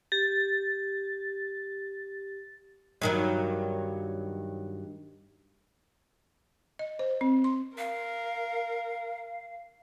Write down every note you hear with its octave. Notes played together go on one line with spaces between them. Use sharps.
G4 A6
G2 D#3 F#3
D#5
C5
C4
C6
A#4 F5